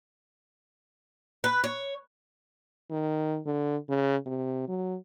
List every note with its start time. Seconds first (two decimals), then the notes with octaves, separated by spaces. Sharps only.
1.44 B4
1.64 C#5
2.90 D#3
3.46 D3
3.89 C#3
4.26 C3
4.68 F#3